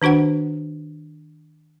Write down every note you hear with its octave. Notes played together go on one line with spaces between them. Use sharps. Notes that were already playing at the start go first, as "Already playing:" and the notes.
D#3 D4 F#4 C5 F#5